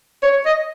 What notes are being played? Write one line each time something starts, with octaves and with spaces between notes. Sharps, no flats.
C#5
D#5